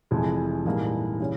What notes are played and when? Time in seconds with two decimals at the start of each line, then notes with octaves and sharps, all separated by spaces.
0.11 F1 F2 E3 G#3
0.65 A#1 G#2 E3 G3 A#3
1.20 C#3 E3 G3 C#4